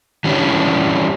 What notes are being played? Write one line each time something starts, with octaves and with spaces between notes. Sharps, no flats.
E3 G3 C#4 D4 E4